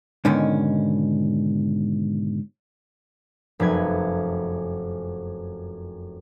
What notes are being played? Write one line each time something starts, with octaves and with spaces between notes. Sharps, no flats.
G#2 B2 D3 D#3 C#4
F1 F#2 B4 G#6